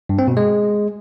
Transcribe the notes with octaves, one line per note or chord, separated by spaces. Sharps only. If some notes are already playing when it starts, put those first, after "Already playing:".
G2
C4
B2
G#3